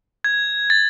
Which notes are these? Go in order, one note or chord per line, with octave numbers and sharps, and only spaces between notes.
G#6
A6